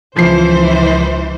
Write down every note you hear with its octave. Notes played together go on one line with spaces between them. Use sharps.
C#2 E3 F3 C5 C7